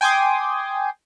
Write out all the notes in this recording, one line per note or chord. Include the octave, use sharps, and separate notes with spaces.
G5 G#5 C6 D6 D#6